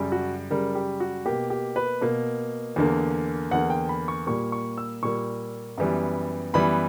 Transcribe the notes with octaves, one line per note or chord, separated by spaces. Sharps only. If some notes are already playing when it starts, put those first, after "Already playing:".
Already playing: F#2 C#3 G3
F#4
F#2 C#3 G3 A#4
G4
F#4
B2 A#3 G4
G4
B4
B2 A#3
E2 D3 A#3
E2 D3 A#3 F#5
G5
B5
C#6
A#2 G3 A#3 C#6
C#6
E6
A#2 G3 A#3 C#6
F#2 E3 G3 B3
F#2 E3 G3 B3 B5